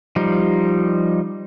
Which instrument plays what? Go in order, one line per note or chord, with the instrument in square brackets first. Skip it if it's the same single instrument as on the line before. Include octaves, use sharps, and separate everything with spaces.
[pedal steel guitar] F3 G3 D#4